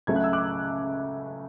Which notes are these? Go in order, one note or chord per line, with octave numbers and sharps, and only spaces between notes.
C#2 C#3 F#3 A3 G#6
F#6
E6
D6 F#6